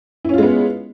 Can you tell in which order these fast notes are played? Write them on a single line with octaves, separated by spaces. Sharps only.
E4 C#4 F4 G#3 B3